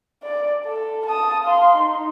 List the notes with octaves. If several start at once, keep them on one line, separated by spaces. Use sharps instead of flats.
D5
A4
A5 D#6
F5 C6
D#4